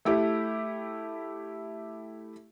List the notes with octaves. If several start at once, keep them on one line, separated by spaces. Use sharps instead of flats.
A3 E4 G4